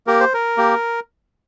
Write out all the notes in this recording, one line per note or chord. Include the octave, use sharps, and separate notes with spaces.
A#3 G4 A#4
C5
A#4
A#3 G4